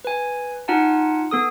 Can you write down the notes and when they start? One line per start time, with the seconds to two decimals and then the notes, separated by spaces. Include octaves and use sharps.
0.05 B4 G#5
0.68 D#4 F4 F#5 G#5 A5
1.31 B3 A4 D#6